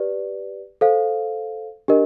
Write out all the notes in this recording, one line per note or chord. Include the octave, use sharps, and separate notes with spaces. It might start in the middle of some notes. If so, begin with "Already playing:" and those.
Already playing: G4 B4 D5
A4 C5 F5
D4 G4 A#4 D#5